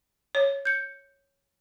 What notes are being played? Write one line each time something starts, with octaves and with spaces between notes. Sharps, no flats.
C#5
G6 C#7